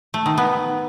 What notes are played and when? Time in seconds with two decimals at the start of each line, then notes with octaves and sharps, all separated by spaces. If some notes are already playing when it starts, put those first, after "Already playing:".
0.14 A3
0.26 D#3
0.38 B3